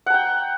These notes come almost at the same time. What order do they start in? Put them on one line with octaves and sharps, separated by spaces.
F#5 A#5 G5